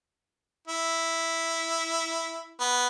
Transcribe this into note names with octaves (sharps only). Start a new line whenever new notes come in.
E4
B3